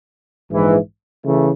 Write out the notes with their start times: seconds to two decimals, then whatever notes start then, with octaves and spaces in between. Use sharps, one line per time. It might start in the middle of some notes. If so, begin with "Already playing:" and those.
0.50 A#1 G#2 E3
1.25 C#3 E3 A3